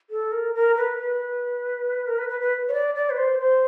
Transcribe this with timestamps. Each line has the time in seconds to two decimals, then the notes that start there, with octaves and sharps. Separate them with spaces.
0.10 A4
0.32 A#4
0.54 A#4
0.76 B4
0.98 B4
2.07 A#4
2.18 B4
2.29 B4
2.40 B4
2.69 C#5
2.73 D5
2.95 D5
3.10 B4
3.17 C5
3.39 C5